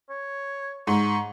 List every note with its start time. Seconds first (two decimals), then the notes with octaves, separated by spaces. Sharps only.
0.10 C#5
0.87 G#2 C#6